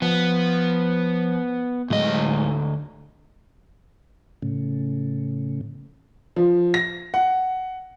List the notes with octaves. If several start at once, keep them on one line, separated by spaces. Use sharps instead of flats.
F3 B3
D2 A2 F#3 G#3 D#5
A2 C#3
F3
A#6
F#5